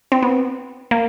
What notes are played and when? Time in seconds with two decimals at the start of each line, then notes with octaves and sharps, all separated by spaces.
0.12 C4
0.22 B3
0.91 A#3